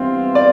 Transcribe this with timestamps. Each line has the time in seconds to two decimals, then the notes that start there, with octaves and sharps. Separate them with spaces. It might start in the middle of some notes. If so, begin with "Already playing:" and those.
Already playing: G2 E3 B3 C4 F4
0.35 D5